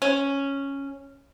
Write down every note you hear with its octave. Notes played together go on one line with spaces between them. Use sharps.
C#4